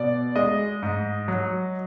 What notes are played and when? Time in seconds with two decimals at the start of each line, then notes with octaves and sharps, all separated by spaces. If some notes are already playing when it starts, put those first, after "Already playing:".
Already playing: B2 D5
0.36 G#3 D#5
0.82 G#2
1.28 F#3